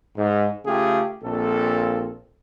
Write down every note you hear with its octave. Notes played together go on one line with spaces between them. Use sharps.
G#2
C#3 A3 F4 G4 G#4
A#1 A#2 C4 A4